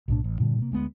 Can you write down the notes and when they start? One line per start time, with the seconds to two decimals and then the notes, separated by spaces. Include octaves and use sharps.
0.08 B1 A2 D4
0.24 A1
0.39 G2 A#2 D3 G3
0.59 C3 A#3
0.72 D2 G#3 B3